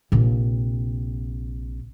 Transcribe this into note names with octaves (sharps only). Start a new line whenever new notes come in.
A#1 C3